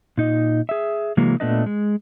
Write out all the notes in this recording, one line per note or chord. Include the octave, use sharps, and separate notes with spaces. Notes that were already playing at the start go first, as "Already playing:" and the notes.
A#2 D#4 D#5
G#4 E5
C3 E3 F#3 G#3 A#3
A#2 A3 B3 D4 B4 D#5
G#3